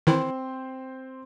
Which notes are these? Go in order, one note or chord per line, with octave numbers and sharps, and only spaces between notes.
D#3 E3 C4 E4 C5